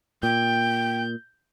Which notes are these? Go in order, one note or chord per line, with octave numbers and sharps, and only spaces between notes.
A#2 G5 G6